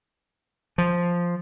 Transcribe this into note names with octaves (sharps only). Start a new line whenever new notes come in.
F3